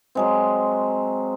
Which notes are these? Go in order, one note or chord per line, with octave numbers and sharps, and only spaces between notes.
F#3 G#3 C4